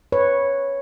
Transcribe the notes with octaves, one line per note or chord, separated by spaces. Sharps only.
B4 C#5